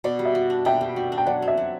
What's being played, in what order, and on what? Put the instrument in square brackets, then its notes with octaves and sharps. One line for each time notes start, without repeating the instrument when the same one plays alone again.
[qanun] B2 [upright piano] D5
[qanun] G3
[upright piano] E5
[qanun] F#4
D4
[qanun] B2 [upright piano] E5 G5
[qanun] G3
F#4
D4
[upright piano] G5
[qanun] F#3 [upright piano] D5 F#5
[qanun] C4
[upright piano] E5
[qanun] F#3